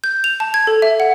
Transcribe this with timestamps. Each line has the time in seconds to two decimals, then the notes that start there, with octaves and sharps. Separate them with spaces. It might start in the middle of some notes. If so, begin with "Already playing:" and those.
0.04 G6
0.24 F7
0.40 A5
0.54 G#6
0.67 A4
0.82 E5
1.00 F#5